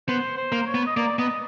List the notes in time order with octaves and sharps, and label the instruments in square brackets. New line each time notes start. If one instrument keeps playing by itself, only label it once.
[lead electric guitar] B3 [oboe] C5
[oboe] C5
[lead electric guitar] A#3
[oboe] C#5
[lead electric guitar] B3
[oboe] D#5
[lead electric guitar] A#3 [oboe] D5
[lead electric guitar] B3 [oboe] D#5